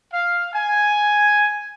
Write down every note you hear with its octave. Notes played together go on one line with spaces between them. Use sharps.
F5
G#5